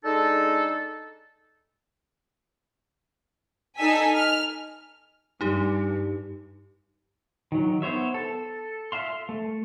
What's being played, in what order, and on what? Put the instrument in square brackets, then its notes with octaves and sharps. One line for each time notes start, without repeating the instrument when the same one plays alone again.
[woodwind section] G#3 D4 D#4 A4
[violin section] D#4 A4 G#5 E6 B6
F6
[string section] G2 [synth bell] D#4 G4
[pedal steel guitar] D#3 F#3
B3 C5 C#5 E5
A4
E5 F5 C6
A3